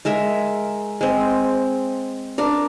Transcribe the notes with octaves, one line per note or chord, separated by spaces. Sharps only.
G#3 A#4 E5
G#3 C4
D4 A#4